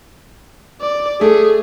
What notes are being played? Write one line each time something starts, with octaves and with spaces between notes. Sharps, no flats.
D5
A3 G#4